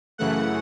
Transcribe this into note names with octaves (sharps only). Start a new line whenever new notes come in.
F#2 C#3 E3 A3 F#5